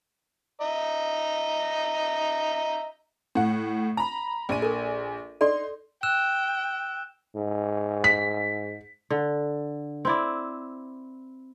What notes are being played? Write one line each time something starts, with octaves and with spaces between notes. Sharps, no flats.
D#5 E5 A#5
A2 F#5
A#5 B5
A#1 G#5 D#7
A4 A#4
D#4 A4 D5 C6
G5 E6 F#6 E7
G#2
B6
D3
C4 E4 D5